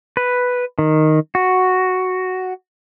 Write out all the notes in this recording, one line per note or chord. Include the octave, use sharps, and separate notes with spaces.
B4
D#3
F#4